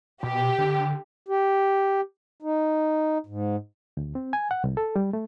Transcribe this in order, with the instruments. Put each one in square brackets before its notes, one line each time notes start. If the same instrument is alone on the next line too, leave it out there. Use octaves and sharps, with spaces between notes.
[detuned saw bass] B2 [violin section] G4
[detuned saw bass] D3
[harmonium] G4
D#4
G#2
[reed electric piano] D2
C4
G#5
F#5
C2
A4
G3
A3